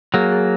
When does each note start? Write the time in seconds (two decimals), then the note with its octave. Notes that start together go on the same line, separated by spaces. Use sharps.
0.14 F#3 A#3 G#4
0.32 G#4